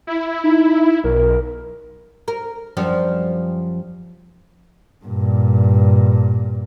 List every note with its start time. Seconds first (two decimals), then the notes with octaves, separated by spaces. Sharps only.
0.07 E4
0.44 D#4
1.04 B1 A#4
2.28 A#4
2.77 F#2 F3 G3
5.05 G2 A#2